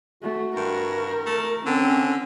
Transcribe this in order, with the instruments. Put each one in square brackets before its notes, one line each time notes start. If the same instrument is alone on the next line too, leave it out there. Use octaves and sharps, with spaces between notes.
[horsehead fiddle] A3 [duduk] F#4
[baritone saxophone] G2 [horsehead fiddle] A#4
[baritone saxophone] A3
[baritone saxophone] D3 [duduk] C4 [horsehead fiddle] C#4